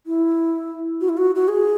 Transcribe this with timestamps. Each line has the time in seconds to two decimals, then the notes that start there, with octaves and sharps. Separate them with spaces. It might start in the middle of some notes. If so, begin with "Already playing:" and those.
0.07 E4
1.01 F#4
1.09 E4
1.17 F#4
1.35 F#4
1.48 G#4